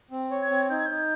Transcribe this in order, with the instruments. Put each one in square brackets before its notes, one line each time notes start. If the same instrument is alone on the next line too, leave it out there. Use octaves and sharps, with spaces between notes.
[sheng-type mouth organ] C4
C#5
[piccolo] G#6
[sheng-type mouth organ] C4
[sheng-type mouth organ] D#4 [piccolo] G6
[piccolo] G#6
[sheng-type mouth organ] D#4 [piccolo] G6